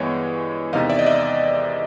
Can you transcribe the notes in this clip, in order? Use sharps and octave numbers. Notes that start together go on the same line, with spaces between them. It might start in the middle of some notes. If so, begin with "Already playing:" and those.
Already playing: G2 E3 G#3 B3 C#5
E2 C3 D#3 D#5 F5
D5 E5
D#5
D5 E5